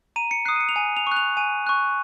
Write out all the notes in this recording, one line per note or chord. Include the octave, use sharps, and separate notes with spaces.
A#5 D#7
C#7
D#6 F#6 C7
D#7
C#7
F7
G#5 D#7
F7
C#6 F#6
F7
G#5 D#7
C#6 F#6